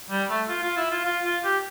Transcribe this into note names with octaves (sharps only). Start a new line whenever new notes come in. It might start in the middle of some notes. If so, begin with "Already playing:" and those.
G3
A3
F4
F4
E4
F4
F4
F4
G4